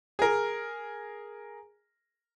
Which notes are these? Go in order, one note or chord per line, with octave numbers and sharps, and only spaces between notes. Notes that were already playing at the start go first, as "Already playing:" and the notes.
G#4 A#4